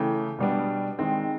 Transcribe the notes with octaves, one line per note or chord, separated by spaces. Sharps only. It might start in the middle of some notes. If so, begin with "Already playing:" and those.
Already playing: C#3 E3 A3 G5
B2 G3 B3 D4
D#3 G#3 C4